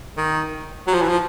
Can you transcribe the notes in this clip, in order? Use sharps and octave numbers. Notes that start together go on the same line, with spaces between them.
D#3
F#3
F3
E3
F3